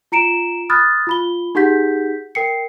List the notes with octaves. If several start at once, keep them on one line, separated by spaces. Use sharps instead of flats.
F4 A#5 C#7 D7 E7
B5 D#6 F6 F#6 A6
F4 B5 G7
D#4 G4 G#4 F#5 G6 B6
A#4 G5 C7 C#7